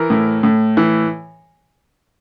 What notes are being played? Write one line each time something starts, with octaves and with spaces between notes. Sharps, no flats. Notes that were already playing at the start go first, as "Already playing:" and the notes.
Already playing: E3 A#4
A2
A2
E3